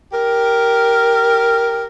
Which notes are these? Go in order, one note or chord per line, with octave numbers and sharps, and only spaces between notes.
G4 A#4